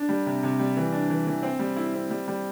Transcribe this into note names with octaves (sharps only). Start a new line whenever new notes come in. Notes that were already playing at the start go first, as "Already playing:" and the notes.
Already playing: D4
G3
C3
C3
G3
E3
D4
E3
E3
C4
G3
E4
C4
G3
G3